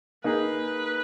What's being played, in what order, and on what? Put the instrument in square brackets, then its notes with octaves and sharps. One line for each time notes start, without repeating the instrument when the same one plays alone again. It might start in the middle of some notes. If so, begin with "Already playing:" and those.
[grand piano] A#3 D#4 G#4 [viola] B4